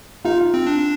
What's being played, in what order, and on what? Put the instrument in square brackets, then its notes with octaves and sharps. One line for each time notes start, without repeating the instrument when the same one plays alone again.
[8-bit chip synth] D#4 [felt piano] F4
[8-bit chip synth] C4
D4